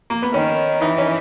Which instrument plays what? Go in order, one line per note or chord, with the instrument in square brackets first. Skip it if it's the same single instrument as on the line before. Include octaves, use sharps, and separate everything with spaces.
[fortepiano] A#3
B3
[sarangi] D#3 [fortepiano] C#4
[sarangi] E3 [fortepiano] D#4
[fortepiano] C#4